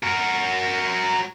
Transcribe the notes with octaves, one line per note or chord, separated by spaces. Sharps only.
F#4 A#4